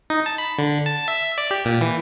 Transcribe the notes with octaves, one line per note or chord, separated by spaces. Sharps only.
D#4
A5
B5
D3
A5
E5
D5
G4
A#2
E3